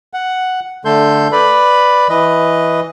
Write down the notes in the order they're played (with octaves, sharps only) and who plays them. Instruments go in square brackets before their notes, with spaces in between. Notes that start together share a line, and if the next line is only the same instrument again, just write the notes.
[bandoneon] F#5
D3 A3 A4 C6 G6
B4 D5 B5
E3 B4 D#5